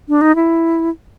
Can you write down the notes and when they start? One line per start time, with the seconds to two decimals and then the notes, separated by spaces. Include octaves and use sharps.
0.09 D4
0.21 D#4
0.35 E4